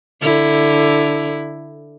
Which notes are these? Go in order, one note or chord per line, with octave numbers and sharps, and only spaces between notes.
D3 E4